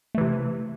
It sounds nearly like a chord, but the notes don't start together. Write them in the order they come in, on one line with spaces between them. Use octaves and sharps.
A3 E3 C3